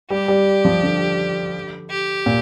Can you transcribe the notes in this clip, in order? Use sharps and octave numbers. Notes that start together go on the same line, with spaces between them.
G3 G4
G3
F3
D3
G4
A#2